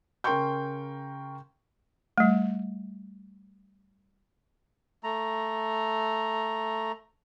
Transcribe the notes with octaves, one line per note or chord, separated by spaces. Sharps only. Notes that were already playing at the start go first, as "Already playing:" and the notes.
C#3 A#4 G5 C6 C#6 G6
G3 A3
A3 A#5